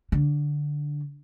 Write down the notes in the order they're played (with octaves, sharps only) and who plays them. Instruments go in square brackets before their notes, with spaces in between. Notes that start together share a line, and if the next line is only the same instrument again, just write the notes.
[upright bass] D3